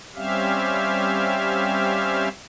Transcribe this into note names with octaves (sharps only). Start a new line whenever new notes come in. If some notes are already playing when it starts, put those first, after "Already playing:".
G3 C4 C#4 G4 E5 F5